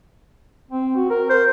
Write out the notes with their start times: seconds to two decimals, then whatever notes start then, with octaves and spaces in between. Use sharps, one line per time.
0.71 C4
0.96 F#4
1.10 A#4
1.29 A#4 C5